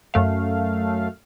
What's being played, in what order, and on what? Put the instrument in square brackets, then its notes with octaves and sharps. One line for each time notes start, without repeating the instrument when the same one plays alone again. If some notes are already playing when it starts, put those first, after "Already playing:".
[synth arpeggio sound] F#2 A3 F5